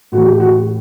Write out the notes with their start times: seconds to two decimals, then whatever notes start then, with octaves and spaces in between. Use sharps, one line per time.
0.12 A2 E3 F#4
0.26 G4
0.40 F#4
0.59 G4